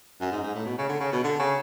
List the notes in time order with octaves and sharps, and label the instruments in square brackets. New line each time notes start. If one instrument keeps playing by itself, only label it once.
[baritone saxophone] F#2
G#2
G#2
A2
B2
C#3
D3
C#3
B2
D3
C#3